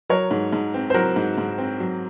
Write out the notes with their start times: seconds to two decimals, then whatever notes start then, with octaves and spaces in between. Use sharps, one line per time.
0.09 F#3 A#4 C#5
0.31 G#2
0.53 G#2
0.74 C4
0.90 C5
0.94 F#3 F#4 A#4
1.16 G#2
1.38 G#2
1.58 C4
1.80 F#3